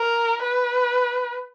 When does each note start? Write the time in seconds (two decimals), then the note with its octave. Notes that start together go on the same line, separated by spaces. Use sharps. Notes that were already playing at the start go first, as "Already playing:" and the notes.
Already playing: A#4
0.43 B4